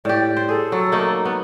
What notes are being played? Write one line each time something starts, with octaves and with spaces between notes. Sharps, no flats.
A2 G4 D5
C5
G#4 A4
F#3
A3 A#3 D#4
B3